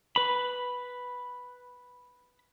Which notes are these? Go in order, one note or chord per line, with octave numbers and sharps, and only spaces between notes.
B4 B5